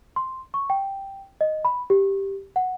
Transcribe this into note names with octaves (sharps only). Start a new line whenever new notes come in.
C6
C#6
G5
D#5
B5
G4
F#5